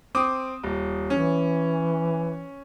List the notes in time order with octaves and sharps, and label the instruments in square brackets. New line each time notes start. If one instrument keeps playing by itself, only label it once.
[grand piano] C4 D6 D#6
D#1
[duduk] E3 [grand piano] C#4